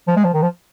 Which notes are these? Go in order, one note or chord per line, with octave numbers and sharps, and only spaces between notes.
F3
G#3
F3
D#3
F3